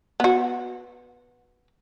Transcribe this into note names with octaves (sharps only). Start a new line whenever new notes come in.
B3 F#4